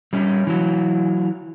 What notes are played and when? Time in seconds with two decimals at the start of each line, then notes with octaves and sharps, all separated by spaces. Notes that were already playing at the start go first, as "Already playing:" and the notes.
0.13 G3 C#4
0.47 E3 F#3